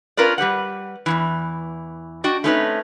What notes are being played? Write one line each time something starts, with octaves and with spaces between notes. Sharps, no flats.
C#4 F4 A#4 B4 D5
G3 G4 B4 F#5
E2 G2 E3
D4 F#4 D#5 G5
A3 C4 C#4 D#4 A#4 B4